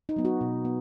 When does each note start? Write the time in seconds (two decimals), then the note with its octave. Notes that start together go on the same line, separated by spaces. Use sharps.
0.09 D#4
0.16 F#3 B3
0.25 F#4
0.41 B2
0.65 B3